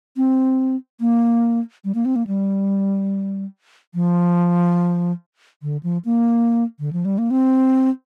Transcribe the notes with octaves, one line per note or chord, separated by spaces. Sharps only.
C4
A#3
G3
A#3
C4
A#3
G3
F3
D3
F3
A#3
D3
F3
G3
A#3
C4